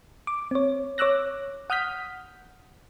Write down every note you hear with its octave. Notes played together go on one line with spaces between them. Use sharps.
D6
C4 C#5
C#5 D6 E6 F#6 A#6
F#5 D#6 F6 G6 B6